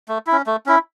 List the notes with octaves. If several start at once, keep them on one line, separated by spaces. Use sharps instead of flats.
A3
E4
C#4
A3
C#4 E4